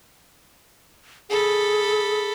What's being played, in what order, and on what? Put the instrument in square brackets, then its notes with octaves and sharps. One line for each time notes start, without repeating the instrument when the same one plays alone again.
[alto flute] G#4 [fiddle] A4 B5